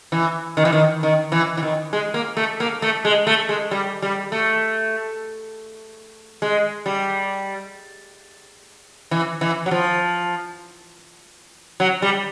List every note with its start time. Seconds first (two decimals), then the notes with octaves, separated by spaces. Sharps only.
0.12 E3
0.57 D#3
0.65 E3
0.72 D#3
1.03 D#3
1.32 E3
1.57 E3
1.63 D#3
1.93 G#3
2.14 A#3
2.37 A3
2.60 A#3
2.82 A3
3.05 G#3
3.27 A3
3.49 G#3
3.71 G3
4.02 G3
4.32 A3
6.42 G#3
6.86 G3
9.11 E3
9.41 E3
9.66 F#3
9.71 F3
11.80 F#3
12.02 G3